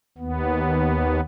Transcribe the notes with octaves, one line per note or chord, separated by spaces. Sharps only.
D#2 B3